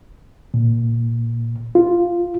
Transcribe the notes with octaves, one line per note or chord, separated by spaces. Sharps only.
A#2
F4